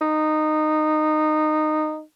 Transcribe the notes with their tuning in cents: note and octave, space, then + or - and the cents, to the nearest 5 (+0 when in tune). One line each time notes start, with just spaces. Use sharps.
D#4 -15